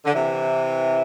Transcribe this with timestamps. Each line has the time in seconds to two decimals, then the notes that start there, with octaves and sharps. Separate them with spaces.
0.05 D3
0.13 C3 E3